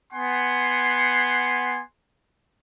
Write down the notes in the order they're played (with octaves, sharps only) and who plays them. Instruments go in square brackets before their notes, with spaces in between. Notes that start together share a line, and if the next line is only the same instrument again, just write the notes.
[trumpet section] B3 F#5 G#5 C6